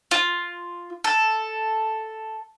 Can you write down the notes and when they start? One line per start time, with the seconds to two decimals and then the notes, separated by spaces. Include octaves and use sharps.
0.11 F4
1.04 A4